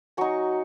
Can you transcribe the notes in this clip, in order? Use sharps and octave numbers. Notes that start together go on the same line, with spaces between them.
F#3 D#4 G#5 C#6